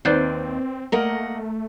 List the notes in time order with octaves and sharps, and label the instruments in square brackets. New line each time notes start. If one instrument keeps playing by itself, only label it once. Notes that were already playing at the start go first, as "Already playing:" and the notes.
[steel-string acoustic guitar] D#2 D#3 [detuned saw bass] C4 [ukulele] B4 C5 D5
[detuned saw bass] A3 [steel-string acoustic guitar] A#3 D#5 F#5 [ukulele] A#4